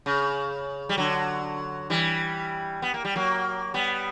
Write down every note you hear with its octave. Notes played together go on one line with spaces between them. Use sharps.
C#3
G3
D3 F#3
E3 G3
B3
A#3
G3
F#3 A#3
G3 B3